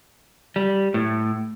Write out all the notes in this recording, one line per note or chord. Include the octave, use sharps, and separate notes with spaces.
G3
A2